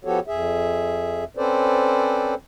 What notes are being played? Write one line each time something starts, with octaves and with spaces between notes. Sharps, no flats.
F3 B3 F#4 G4 A4 C#5
F2 G#4 E5
C4 C#4 A4 B4 C5 D5